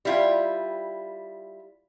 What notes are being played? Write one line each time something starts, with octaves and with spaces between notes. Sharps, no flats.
G3 E4 F4